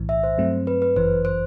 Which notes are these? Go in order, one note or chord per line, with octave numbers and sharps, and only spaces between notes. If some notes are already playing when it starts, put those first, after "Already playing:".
Already playing: B1 A2 E3
E5
C5
G2 F#3 A3 C4
B4
B4
G1 F#2 E3 C5
C5